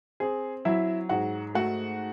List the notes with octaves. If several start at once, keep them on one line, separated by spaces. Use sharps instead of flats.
C4 G#4
F#3 E4 E5
G#2 F#4 F#5
A3 F#4 F#5